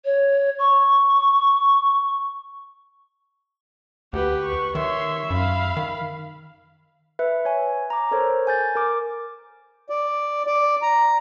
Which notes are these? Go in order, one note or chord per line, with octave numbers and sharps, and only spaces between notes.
C#5
C#6
D2 G4 B4 F#5
C#6
D#3 C#5 E5 C6
F#2 F5 B5
D#3
B4 E5
C#5 G#5
A#5 D6
A4 A#4 C5 C#5
G#5 G6 A6
A#4 D6
D5
D5
A#5